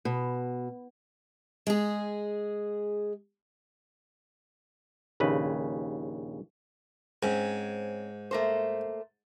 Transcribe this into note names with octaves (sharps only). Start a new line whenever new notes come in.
B2
G#3 G#4
A#1 D#2 C#3 B4
G#2 C4 C#4
A3 A#3 C5